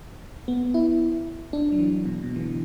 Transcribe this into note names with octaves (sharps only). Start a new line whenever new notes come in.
B3
E4
D4
F#3
E3
B2
B2
E3
D3